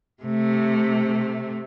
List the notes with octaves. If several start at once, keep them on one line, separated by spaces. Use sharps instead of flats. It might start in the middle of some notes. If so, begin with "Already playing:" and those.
C3 A3